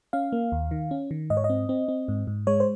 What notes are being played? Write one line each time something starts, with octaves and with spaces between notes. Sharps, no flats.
C#4 F5
A#3
D#2
D#3
C#4
D#3
G#2 D#5
C#5
D#5
C4
C4
C4
G#2
G#2
G#3 C#5
C5